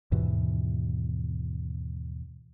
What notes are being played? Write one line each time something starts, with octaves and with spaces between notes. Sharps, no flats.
D#2 G#2 B2 E3